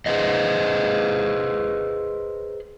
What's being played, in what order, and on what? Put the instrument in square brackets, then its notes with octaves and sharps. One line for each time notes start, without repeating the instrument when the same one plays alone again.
[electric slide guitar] G#4 B4 C5 D#5